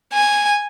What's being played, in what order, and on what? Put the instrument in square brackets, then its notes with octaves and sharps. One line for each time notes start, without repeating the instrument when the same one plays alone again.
[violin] G#5